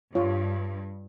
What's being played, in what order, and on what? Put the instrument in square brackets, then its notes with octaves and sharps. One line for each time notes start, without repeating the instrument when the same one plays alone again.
[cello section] G2 [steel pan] F4 C#5